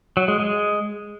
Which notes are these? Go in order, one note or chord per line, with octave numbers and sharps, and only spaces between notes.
F#3
G#3
G#3